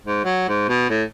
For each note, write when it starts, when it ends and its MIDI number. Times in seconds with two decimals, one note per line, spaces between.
0.05 0.21 44
0.25 0.44 54
0.48 0.64 44
0.69 0.85 47
0.90 1.03 45